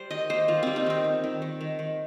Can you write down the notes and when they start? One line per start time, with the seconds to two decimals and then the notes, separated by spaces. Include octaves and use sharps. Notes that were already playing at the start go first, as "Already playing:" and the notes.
Already playing: G3 C5
0.10 D#3 D#5
0.30 A#3 C5
0.48 D#3 F4
0.63 G3 C4
0.76 D#4
0.86 D#3 C4
1.04 D#3
1.24 D#3
1.42 D#3
1.61 D#3
1.79 D#3